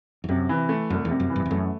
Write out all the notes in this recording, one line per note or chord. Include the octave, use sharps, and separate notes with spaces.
E2
F#2 C3
E3
A3
C2 F#2
E2
C3
F#2
E3
G2
E2
F#2 A3